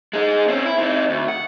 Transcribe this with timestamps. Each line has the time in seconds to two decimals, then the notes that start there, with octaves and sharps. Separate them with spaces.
0.13 G#3 D#4
0.48 C4 C#4
0.65 E4
0.78 C4 D#4
1.10 D2
1.28 F#5